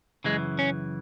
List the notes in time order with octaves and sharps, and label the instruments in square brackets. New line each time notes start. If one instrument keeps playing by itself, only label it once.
[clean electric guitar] F#2 C#3 E3 G#3
C#4